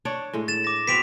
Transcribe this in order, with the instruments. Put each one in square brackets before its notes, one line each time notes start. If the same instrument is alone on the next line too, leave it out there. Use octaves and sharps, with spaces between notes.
[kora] D4 C#5 D5
A2 G#3
[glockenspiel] A6 E7
D6 A#6
[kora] B3 C4 F#4 [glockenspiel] B6 D7 F7